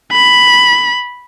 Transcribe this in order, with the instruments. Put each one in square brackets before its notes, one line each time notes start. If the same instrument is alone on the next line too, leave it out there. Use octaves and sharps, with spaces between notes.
[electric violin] B5